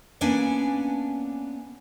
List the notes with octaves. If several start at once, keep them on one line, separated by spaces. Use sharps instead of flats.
A#3 B3 C#4 D4 G#5